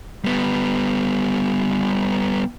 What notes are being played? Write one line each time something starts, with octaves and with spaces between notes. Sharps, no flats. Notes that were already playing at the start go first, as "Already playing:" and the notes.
G3 B3